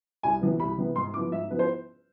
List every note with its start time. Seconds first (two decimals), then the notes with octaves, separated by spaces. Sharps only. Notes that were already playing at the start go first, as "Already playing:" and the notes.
0.23 C2 G#5
0.41 C3 E3 B3
0.59 C2 B5
0.78 C3 E3 B3
0.96 G#2 C6
1.14 F3 B3 E4 D6
1.32 G#2 E5
1.50 F3 B3 E4 B4
1.59 C5